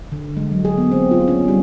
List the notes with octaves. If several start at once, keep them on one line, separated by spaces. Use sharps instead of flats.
D3
G#3
F#3
G#4
B3
C4
F4
C#4
G3